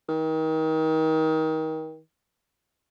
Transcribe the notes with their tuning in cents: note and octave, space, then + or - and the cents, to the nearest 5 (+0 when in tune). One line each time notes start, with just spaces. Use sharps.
D#3 +30